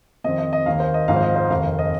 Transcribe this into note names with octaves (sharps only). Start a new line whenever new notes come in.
F2 D#3 C4 D#5
D#5
D#5
D#2 D#3 A#3 F5
C5
D#5
G#1 G#2 F3 F5
C5
D#5
C5
F1 D#2 D#3 F5
F5
D#5